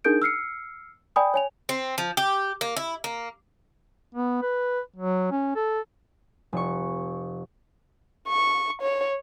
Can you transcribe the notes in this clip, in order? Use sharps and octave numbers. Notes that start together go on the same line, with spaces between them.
D4 D#4 G#4 A#4 G6 D7
E6 F6 C7 C#7
D5 G5 G#5 B5 D#6
C#5 G#5 F7
C4
F3
G4
A#3
E4
A#3
B3
B4
F#3
C#4
A4
F1 C#6
C#6
C#5